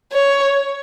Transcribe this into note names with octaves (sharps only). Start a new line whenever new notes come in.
C#5